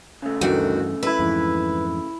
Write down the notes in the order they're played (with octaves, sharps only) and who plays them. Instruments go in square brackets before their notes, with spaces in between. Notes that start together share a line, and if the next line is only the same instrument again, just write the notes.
[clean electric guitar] C#3 A3
[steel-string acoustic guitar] D2 D#3 F#4 [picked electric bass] G2 E3
[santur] E4 E5 [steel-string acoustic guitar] B4
[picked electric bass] F2 G#2 E3